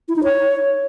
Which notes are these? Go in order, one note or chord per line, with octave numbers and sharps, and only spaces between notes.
E4
D#4
C#5